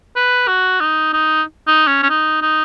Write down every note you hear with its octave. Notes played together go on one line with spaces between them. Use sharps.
B4
F#4
D#4
D#4
D#4
C#4
C#4
D#4
D#4